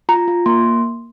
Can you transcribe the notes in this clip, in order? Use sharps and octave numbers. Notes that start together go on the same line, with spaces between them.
F4 A#5
F4
A#3 C6